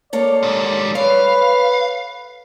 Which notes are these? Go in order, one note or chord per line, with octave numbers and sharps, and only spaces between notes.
A#3 A4 C#5 D5
G#2 G3
B4 C#5 F5